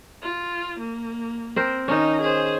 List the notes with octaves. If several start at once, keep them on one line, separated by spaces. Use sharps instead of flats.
F4
A#3
C4 A#4 C5
D#3 C#4 D#4
G#4 C5